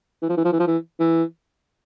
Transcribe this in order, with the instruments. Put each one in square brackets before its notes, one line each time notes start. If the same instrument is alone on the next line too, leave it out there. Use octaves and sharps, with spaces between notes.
[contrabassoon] E3
F3
E3
F3
E3
F3
E3
E3